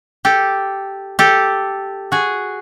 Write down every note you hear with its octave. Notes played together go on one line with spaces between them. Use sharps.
G4 A4
G4 A4
F#4 G#4